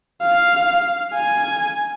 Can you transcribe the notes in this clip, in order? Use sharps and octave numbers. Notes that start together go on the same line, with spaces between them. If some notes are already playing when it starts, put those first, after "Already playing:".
F5
G#5